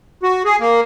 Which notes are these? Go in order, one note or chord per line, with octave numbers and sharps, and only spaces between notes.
F#4
G#4
A#3